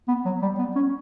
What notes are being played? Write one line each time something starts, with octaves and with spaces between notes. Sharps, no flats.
B3
F#3
G3
B3
C#4